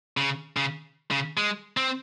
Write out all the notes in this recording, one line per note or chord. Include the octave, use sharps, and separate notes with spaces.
C#3
C#3
C#3
G#3
C4